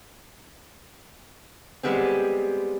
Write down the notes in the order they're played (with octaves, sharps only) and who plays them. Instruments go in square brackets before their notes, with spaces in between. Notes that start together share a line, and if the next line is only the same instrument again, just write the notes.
[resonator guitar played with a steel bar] G3 G#3 B3 C4